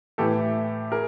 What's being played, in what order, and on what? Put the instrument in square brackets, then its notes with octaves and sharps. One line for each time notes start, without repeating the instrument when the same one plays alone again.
[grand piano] A2 E3 A3 G4 A4
G#4 A#4